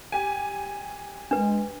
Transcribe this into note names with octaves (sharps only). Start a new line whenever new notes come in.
G4 G#5
G#3 D4 B4